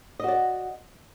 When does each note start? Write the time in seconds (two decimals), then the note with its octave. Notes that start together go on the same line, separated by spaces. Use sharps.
0.20 D#5
0.24 F#4
0.28 D5